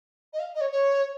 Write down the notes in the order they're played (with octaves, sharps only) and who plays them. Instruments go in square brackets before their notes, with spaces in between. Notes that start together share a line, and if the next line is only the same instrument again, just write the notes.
[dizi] D#5
F5
D#5
C#5
C#5